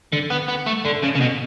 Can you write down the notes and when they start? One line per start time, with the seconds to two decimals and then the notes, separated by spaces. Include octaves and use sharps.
0.13 D3
0.30 B3
0.48 B3
0.66 A3
0.85 D3
1.03 C#3
1.15 C#3
1.21 B2